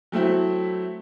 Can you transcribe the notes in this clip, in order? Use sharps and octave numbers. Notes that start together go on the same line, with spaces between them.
F#3 A3 C4 E4